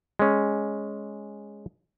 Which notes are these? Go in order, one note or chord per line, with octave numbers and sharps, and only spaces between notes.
G#3 C#4